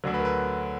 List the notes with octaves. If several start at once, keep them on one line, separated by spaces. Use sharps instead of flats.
D2 D3 F#3
B4
A#4
B4